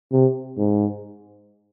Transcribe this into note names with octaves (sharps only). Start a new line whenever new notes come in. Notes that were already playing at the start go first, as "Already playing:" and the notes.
C3
G#2